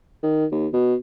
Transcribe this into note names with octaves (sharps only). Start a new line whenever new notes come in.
D#3
D#2
B2